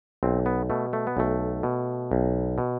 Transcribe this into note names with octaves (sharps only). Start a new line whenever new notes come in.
B1 C4
B3
B2 A3
A3
B3
B1 A3
B2
B1
B2